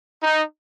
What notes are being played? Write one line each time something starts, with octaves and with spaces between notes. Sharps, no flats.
D#4